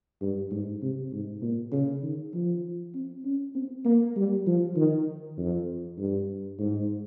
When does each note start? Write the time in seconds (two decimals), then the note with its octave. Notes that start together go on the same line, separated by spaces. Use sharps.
0.21 G2
0.51 G#2
0.82 C3
1.12 G#2
1.42 A#2
1.72 C#3
2.03 D#3
2.34 F3
2.94 C4
3.24 C#4
3.55 C4
3.85 A#3
4.16 G3
4.47 F3
4.76 D#3
5.38 F2
5.98 G2
6.59 G#2